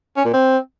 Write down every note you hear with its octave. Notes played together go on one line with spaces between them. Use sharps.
C#4
A#2
C4